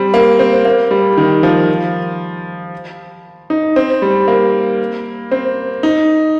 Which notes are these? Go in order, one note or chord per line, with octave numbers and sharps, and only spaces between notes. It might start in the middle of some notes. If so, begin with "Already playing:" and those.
Already playing: G3 C4
A#3
C4
A#3
G3
D#3
F3
D#4
C4
G3
A#3
C4
D#4